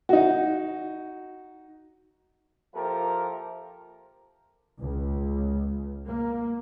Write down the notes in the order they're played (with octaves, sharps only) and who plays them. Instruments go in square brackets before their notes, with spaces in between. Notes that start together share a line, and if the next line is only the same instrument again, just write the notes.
[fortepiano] D#4 F#4
[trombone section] F3 A#3 E4 G4 A4 A#4
[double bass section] C#2
A#3